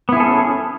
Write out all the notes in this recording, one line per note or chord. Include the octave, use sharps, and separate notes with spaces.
B3 C#4 E4 G#4 A4